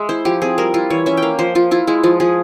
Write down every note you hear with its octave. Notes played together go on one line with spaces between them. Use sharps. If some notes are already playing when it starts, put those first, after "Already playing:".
Already playing: G#3 E5
E4 C5
F3 G4
C4 G#4
G3 A#4
E4 F4
E3 C#5
C#4 E5
G5
A#3 F5
F3 C5
F3 F4
E4 F4
G#3 E4
F3 F4
F3 G#4